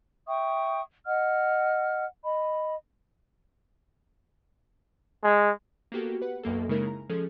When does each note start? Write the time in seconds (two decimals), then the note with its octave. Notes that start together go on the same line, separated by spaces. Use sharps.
0.27 E5 G5 C#6 D#6
1.06 D#5 F#5 F6
2.24 D#5 B5
5.24 G#3
5.92 A#3 B3 F#4 G4 A4
6.22 B4 F#5
6.43 B1 F#2 A#3 A4
6.69 C#3 G#3 A#3 D#4 E4 A#4
6.87 A#5
7.10 F3 G#3 C#4 G#4 A4